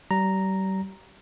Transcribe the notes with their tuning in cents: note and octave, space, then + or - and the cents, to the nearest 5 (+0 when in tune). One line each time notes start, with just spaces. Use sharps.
G3 -35 A#5 +0